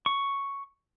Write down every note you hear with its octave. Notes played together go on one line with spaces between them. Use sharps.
C#6